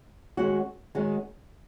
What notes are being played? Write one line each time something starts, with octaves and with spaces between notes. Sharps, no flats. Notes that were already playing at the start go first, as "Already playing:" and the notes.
D#3 G#3 C#4 F#4
D#3 G#3 C#4 F#4